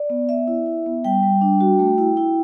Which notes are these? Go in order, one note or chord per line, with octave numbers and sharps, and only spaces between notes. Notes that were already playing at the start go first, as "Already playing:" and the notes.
Already playing: D5
B3
B3 E5
E4
E4
B3
G3 G5
G3
D4
F#4
A3
E4
E4